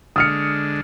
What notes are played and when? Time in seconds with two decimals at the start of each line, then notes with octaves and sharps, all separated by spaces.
0.16 D3 G#3 D4 D#6 F6 C#7